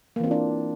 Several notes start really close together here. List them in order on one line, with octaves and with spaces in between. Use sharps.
A#3 E3 C4 F4 D4